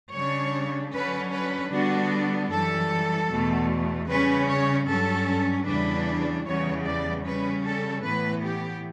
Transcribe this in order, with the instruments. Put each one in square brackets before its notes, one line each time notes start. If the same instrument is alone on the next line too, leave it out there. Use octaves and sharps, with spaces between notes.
[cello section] C#3 G3 D4 C#5
D3 F#3 C#4 B4
B4
D3 G3 B3 D4 F#4
F#2 E3 G3 A4
E2 B2 A3
C#3 G3 C#4 B4
C#5
G2 F#3 C#4 A4
E2 C#3 E3 G3 D4 B4
E2 C#3 G3 B3 C#5
D5
C#3 G3 C#4 B4
A4
A2 E3 B3 B4
G4